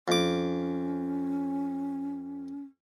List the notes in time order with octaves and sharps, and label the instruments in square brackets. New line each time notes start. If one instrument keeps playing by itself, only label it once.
[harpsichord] F2 D6 [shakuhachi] C#4